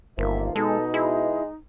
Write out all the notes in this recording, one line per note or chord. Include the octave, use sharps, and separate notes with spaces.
G1 C3 D#3 F3 A#3 E5
B2 G#3 D#4 A4
G#3 E4